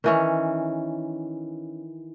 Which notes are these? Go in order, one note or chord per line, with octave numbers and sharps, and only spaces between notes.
D#3 E3 C#4